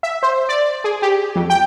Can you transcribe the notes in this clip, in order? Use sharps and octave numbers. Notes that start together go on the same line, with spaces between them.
E5
C5
D5
G#4
G4
F2
G5